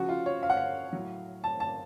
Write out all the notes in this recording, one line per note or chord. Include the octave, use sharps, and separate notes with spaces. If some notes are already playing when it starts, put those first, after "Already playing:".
Already playing: C#3 F3 F#4
F4
C#5
F5
F#5
F5
A2 F#3
A5
A5